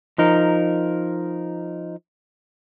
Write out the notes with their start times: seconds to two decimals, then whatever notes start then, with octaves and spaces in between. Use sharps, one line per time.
0.18 F3 D#4 A#4